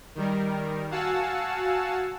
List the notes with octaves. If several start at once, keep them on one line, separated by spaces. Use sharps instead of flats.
D#3 G3 A#4
F#4 F5 F#5 G#5 A5 E6